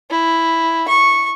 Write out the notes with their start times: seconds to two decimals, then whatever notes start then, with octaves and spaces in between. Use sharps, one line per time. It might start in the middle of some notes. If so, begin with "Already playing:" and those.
0.10 E4
0.88 C#6